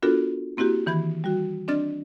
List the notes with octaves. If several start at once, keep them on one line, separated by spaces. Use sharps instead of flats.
B3 D4 F4 F#4 A4 A#4
A#3 C4 E4 F#4 G4
D#3 E3 B5 G#6
G3 F#4
C4 D4 D5 D#5 F6 A6